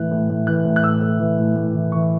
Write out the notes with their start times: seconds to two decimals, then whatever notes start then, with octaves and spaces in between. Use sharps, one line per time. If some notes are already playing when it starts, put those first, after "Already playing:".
Already playing: A2 E3 F#6
0.11 A2
0.30 A2
0.47 E3 F#6
0.65 A2
0.76 F#6
0.83 A2 E6
1.01 A2
1.19 E3
1.39 A2
1.56 A2
1.75 E3
1.92 E3 C#6